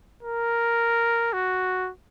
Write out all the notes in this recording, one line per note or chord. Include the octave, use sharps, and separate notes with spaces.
A#4
F#4